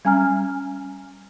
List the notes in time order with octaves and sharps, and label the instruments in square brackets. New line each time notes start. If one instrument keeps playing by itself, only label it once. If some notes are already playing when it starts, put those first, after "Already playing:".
[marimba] G3 C#4 G#5 A#5 F6